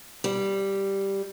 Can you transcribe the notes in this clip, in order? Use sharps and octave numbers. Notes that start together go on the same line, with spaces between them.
G3